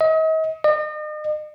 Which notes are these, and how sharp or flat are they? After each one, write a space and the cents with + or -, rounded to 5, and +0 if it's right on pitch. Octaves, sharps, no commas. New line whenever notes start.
D#5 +40
D#5 -40